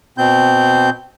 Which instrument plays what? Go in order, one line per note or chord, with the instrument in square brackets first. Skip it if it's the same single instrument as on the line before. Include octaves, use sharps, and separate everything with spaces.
[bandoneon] B2 C4 G6